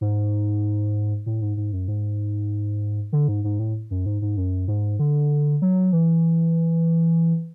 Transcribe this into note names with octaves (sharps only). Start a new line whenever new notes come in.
G#2
A2
G#2
G#2
F#2
G#2
D3
G#2
G#2
A2
F#2
G#2
G#2
F#2
G#2
D3
F#3
E3